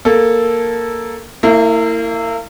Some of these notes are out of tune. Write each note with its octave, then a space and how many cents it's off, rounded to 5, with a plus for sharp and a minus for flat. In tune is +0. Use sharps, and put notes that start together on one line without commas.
A#3 +0 A4 +0
A#3 -35 E4 +0